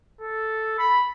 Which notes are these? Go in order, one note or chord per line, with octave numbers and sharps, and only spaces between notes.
A4
B5